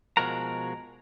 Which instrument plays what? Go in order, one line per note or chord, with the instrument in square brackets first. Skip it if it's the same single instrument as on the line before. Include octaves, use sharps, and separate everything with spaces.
[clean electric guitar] B2 F3 G#3 F#4 A#4 A#5